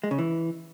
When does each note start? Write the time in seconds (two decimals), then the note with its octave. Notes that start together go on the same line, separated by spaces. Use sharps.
0.04 G#3
0.11 C#3
0.19 E3